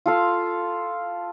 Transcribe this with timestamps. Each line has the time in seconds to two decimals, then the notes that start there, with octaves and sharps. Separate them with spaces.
0.06 F4 A4 F5